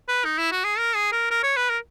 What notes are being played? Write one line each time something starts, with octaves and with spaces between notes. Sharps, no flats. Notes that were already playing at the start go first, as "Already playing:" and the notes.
B4
D#4
E4
F#4
G#4
A#4
G#4
A#4
A#4
C#5
B4
A#4